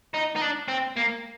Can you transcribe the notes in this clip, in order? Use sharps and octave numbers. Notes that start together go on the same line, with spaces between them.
D#4
D#4
D4
C4
A#3